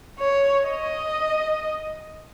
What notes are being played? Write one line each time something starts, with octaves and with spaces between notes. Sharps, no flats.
C#5
D#5